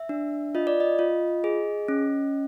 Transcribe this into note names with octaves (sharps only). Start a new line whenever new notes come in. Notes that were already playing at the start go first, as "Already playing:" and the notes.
Already playing: E5
D4
F4 D#5
D5
D#5
F4
G#4
C#4